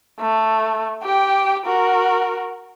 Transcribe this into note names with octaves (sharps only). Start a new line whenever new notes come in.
A3
G4 G5
F#4 A#4